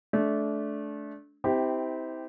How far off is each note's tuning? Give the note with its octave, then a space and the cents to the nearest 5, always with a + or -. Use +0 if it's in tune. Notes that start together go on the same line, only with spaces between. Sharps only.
A3 -25 D4 -20
C4 -20 E4 -35 G4 +0